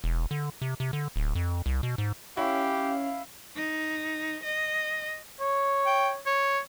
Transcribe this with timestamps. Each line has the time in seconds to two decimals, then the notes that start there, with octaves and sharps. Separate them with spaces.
0.04 E1
0.31 D3
0.62 C3
0.80 C3
0.93 D3
1.16 D1
1.35 F2
1.66 C2
1.83 B2
1.98 G#2
2.37 C#4 E4 G4 F5
3.55 D#4
4.43 D#5
5.40 C#5
5.86 G5
6.26 C#5